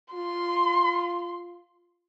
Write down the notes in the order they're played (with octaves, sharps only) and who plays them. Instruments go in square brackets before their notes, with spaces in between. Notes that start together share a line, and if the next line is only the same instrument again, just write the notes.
[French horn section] F4 [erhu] C6